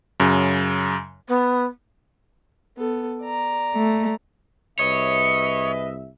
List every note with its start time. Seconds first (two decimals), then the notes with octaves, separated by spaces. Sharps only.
0.20 F#2 C#3
1.28 B3
2.77 B3 A4
3.22 D5 A#5
3.75 A3
4.79 C2 G#4 B4 C#5 D#5 E5